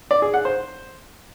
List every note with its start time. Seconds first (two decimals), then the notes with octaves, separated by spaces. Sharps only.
0.11 D5
0.22 G#4
0.34 F#5
0.45 C5